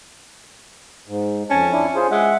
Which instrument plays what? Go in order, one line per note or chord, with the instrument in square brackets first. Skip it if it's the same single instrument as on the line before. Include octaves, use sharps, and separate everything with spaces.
[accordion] G#2
[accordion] F2 A5 [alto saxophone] C#4
[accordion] D4 E4
F4 G#4 C5
[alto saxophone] G#3 [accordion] E5 F#5